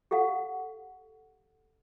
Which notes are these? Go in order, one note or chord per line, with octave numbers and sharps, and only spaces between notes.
G4 A4 F5 F#5